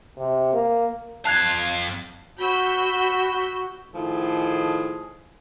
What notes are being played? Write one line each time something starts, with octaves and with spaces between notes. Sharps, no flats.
C3
A#3
F2 F5 A5 F#6 G#6
F#4 B5 E6 G6
A2 D#3 F3 G#4 A4